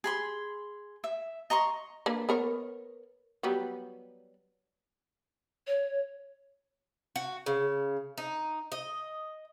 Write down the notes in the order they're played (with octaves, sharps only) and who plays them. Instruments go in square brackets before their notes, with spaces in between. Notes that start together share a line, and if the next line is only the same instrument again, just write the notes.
[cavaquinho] G#4 B5 C6
E5
D#5 A#5 C6 C#6
[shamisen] A#3 D4 B4
B3 A#4 C#5
F#3 G3 B3
[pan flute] C#5
[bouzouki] F#4
C#3
D#4
D#5